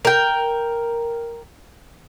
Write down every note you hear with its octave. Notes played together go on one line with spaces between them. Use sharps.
A#4 G5